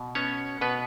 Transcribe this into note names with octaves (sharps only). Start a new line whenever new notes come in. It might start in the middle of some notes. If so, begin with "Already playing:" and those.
Already playing: B2
B3 C#4 C#5
B2 B3 B4